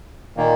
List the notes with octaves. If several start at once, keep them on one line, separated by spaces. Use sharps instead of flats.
A#2 D#3 A#3